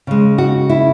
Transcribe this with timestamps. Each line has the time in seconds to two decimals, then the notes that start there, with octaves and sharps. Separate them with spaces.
0.07 C#3 G#3
0.38 F#4
0.69 E4